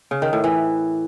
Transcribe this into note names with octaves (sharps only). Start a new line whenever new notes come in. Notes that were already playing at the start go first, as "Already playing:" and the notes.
C#3
D#3
A2
E3